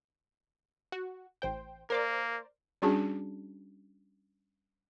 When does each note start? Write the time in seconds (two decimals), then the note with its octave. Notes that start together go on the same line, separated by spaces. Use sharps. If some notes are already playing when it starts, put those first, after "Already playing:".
0.92 F#4
1.42 A1 C5 G5
1.90 A#3 A#4 C5 D5
2.82 G3 C#4 D4 F#4 G#4 A5